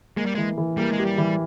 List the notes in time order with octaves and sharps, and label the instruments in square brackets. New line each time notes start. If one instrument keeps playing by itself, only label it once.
[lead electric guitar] G#3 [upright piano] A#3
[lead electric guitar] G3
[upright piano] E3 [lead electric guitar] G#3
[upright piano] E3
[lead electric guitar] G3 [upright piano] A#3
[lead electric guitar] G#3
[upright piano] G4
[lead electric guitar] G3
[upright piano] E3